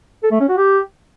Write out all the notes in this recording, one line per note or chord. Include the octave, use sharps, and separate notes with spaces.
A4
A3
C#4
F#4
G4